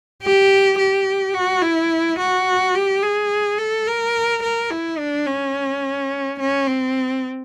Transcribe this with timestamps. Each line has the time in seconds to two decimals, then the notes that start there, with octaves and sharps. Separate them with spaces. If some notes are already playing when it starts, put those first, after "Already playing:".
0.22 G4
0.78 G4
1.34 F#4
1.62 E4
2.18 F#4
2.75 G4
3.03 G#4
3.58 A4
3.87 A#4
4.43 A#4
4.70 E4
4.99 D4
5.27 C#4
6.39 C#4
6.67 C4